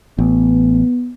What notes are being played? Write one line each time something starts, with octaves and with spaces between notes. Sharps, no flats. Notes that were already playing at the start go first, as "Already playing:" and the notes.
A1 B3